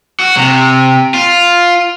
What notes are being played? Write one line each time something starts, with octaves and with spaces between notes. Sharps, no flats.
F#4
C3
F4